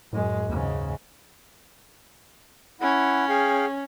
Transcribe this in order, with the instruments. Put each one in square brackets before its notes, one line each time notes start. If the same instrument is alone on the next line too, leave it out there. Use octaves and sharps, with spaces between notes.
[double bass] F#2 G#3 [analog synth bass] A2
[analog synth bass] D#2 [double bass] G#2 C#3
[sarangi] C#4 [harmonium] E4 F#5
[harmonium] G#4 F5 G5